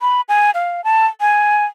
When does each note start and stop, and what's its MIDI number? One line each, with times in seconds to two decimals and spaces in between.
0.01 0.21 83
0.29 0.51 80
0.54 0.84 77
0.84 1.07 81
1.21 1.65 80